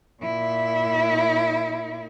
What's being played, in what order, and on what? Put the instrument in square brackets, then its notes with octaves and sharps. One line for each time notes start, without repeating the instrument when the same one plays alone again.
[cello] A#2 E4